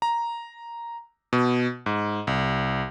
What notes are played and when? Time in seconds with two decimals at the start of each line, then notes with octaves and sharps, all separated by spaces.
0.02 A#5
1.33 B2
1.86 G#2
2.27 C2